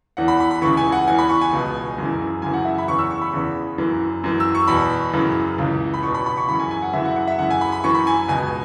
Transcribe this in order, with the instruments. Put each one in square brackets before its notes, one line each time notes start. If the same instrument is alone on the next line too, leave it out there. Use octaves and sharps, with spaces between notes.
[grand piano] E2 E3 F#5
B5
B5
B5
C#2 C#3 E3 C#6
G#5
F#5
E2 E3 G#5
B5
C#6
G#5
C#2 B2
F#2 C#3 E3
F#2 C#3 E3 G#5
F#5
E5
B5
E2 C#3 E3 C#6
E6
C#6
B5
E2 C#3 E3
F#2 E3
F#2 E3
E6
C#6
E2 B2 B5
F#2 C#3 E3
C#2 C#3 E3
B5
E2 B2 C#6
B5
B5
C#6
F#2 C#3 E3 B5
G#5
G#5
F#5
F#2 C#3 E3 E5
F#5
F#5
E5
F#2 C#3 E3 F#5
G#5
B5
B5
F#2 E3 C#6
B5
G#5
C#2 B2 G#5